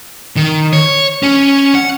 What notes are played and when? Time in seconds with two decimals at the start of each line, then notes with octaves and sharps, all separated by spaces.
0.36 D#3
0.73 C#5
1.23 C#4
1.75 F#5